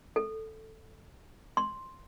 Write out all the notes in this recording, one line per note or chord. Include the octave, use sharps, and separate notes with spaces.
A4
C6